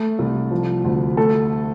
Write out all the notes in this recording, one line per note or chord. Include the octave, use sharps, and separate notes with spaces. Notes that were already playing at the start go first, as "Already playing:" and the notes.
Already playing: A3
C2
F3
D2
A3 A4